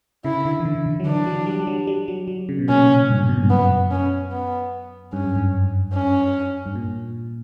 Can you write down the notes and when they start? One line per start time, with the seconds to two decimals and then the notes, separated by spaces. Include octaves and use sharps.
0.25 C#3 E4
0.45 D3
0.60 E3
0.65 D3
0.86 D3
1.00 F#3
1.06 E3 D4
1.27 F#3
1.46 G3
1.60 G3
1.67 F#3
1.87 G3
2.08 F#3
2.28 F#3
2.49 C#3
2.59 B2
2.69 A#2 C#4
3.10 G2
3.29 B2
3.36 A#2
3.43 G2
3.50 F#2 B3
3.91 C#4
4.32 B3
5.13 G2 C#4
5.24 F#2
5.36 G2
5.94 C#4
6.66 G2
6.75 A#2